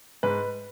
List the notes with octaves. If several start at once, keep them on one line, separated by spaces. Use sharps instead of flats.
G#2 B4